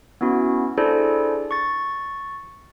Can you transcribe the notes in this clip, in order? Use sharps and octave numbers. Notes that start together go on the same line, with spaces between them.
B3 C#4 E4 F#4
D4 E4 G#4 A4 C5 D5
C#6 A6